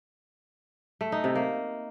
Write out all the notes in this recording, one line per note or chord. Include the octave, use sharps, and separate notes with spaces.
A3
D#4
C3
A#3